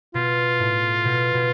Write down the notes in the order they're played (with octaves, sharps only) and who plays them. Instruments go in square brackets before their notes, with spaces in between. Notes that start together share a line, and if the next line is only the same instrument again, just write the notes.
[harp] B2 [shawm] F4
[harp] A2
B2
B2